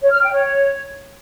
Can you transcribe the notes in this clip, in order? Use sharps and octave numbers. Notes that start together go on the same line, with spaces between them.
C#5
F6
G5
C#5